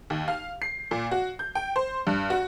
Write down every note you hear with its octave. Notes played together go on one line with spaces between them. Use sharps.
D#2
F5
C7
A#2
F#4
G6
G5
C5
G2
F#4